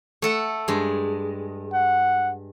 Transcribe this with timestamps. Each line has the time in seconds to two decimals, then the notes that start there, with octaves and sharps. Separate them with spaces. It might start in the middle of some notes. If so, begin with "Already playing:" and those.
0.22 A3 A4 F#5
0.68 G2 G#3
1.73 F#5